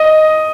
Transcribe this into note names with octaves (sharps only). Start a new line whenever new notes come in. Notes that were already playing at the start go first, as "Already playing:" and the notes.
Already playing: D#5